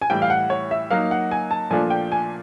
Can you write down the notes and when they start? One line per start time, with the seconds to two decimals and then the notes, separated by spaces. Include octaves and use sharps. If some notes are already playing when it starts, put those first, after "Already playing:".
0.02 G#5
0.10 A2 E3 G3 G5
0.22 F5
0.30 F#5
0.50 C#5
0.71 E5
0.91 F#3 A#3 D#4 F5
1.11 F#5
1.31 G#5
1.51 A5
1.70 A#2 F3 A3 D4 F4 G#5
1.90 G5
2.12 G#5